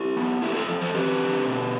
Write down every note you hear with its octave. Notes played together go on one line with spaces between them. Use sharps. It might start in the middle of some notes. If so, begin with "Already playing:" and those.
Already playing: E4 G4
B3
A3 E4 G4
F4 A4
F3
A4 C5
C4 G4 B4
D3
B2